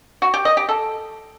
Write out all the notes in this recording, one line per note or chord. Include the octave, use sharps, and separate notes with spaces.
F#4
G4
D#5
G4
A4